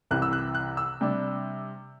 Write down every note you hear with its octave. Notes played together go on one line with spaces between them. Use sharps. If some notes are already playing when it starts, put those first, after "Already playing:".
C2 C3 E3 F#6
E6
F#6
F#6
E6
C3 G3 D4